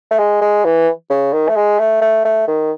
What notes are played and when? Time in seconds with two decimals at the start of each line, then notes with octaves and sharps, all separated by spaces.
0.11 A3
0.18 G#3
0.41 G#3
0.64 E3
1.10 C#3
1.33 D#3
1.48 A3
1.56 G#3
1.79 A3
2.02 A3
2.25 A3
2.47 D#3